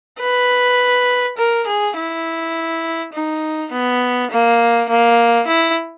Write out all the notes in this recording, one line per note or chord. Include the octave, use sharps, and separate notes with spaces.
B4
A#4
G#4
E4
D#4
B3
A#3
A#3
E4